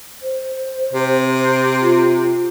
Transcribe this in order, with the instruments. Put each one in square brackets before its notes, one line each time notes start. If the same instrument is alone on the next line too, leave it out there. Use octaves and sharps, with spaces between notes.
[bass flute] C5
[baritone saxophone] C3
[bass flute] F4